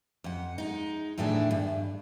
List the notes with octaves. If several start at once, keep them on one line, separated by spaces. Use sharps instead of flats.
F2 F#5
G#3 D#4
E2 A2 D#3 D4 G#4 E5
G2